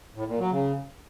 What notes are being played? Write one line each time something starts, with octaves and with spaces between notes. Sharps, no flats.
A2
A#2
F#3
C#3